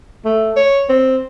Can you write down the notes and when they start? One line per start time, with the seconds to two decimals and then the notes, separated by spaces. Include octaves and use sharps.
0.25 A3
0.57 C#5
0.89 C4